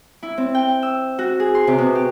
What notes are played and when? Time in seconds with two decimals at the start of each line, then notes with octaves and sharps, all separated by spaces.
0.23 E4
0.38 C4
0.55 G5
0.83 E6
1.19 F#4
1.40 G#4
1.55 C6
1.67 C3
1.78 B2
1.95 G4